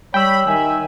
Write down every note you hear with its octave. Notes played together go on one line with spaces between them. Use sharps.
G3 C#5 G5 B5 E6
D#3 E5 G#5